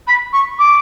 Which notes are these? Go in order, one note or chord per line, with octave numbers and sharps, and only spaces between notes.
B5
C#6
D6